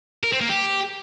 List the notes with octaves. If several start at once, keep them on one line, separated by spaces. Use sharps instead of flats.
A#4
C4
A#3
G4